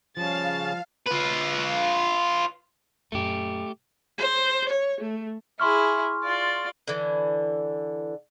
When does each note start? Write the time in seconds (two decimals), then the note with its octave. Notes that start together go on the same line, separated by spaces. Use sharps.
0.17 C#3 F3 G3 F5 A5 A6
1.07 F4 B4
3.12 F#2 A#2 A3 G4
4.18 C5
4.69 C#5
5.01 A3
5.60 E4 G#4 C6 C#6 F6
6.24 F4 D5
6.88 D3 E3